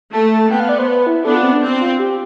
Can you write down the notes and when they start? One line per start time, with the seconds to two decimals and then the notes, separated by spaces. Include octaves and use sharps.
0.13 A3 A5
0.50 B3 G5
0.60 F5
0.69 D5
0.78 C5
0.88 B4
1.07 E4
1.25 B3 D4 A4
1.35 F4
1.43 C4
1.53 D4
1.62 C4
1.80 F4
1.99 G4